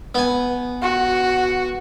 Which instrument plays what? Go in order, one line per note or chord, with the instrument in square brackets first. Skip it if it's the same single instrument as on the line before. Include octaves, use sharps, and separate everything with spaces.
[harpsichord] B3 G#5
[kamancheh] F#4